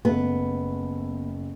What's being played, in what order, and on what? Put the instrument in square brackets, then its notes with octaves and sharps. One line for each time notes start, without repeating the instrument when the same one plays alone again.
[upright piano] F#1 A3 [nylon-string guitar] B3